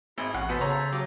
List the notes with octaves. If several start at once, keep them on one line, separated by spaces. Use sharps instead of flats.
G#1 E4 G#4
A1 C#4 F#4 F5 F#5
B2 B3 A4 C5 E5
C#3 C#5 A#5
C#3
F#3 G4 D6